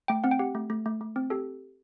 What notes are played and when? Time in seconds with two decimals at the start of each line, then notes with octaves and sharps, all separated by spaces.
0.08 A3 G5
0.24 C4 F#5
0.31 G5
0.39 G4 F#5
0.55 A3
0.70 A3
0.86 A3
1.01 A3
1.16 C4
1.30 G4 A4